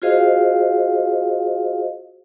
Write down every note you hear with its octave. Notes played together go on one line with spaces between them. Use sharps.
F4 F#4 G#4 C5 D#5 F5